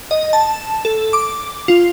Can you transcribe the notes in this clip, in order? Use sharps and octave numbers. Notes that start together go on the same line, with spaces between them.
D#5
A5
A4
D6
F4